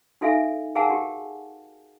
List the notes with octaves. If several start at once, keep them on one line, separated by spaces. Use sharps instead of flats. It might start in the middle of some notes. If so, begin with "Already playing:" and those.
D#4 F#4 A4 E5 F5 G#5
G#4 A#4 F5 F#5 G#5 A5
F#4 G4